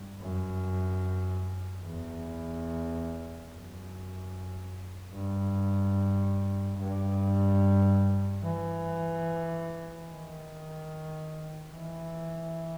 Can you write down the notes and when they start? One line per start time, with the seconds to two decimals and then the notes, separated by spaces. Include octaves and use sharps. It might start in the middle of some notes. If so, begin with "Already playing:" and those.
Already playing: G2
0.21 F#2
1.84 E2
3.50 F#2
5.15 G2
6.79 G2
8.44 E3
10.08 D#3
11.72 E3